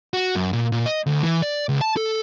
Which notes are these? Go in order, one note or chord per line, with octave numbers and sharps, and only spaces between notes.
F#4
F#2
A#2
A#2
D#5
D2
E3
D5
C#2
A5
A4